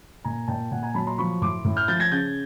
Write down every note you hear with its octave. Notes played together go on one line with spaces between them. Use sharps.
A#2 G#5 A#5
A#2 G5 A5
A#2 F#5 G#5
G#5 A#5
F#3 A5 B5
A#5 C6
F3 B5 C#6
A2 C6 D6
A2
F6 G6
F3 G6 A6
G#6 A#6
C#3 G6 A6